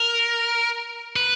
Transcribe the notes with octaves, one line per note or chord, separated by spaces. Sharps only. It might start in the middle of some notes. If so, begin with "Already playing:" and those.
Already playing: A#4
B4